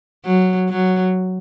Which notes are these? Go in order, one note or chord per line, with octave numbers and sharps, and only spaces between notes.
F#3
F#3